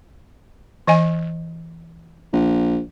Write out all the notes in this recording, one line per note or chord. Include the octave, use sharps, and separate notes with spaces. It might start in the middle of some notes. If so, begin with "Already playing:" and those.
E3 D#5 G#5
A#1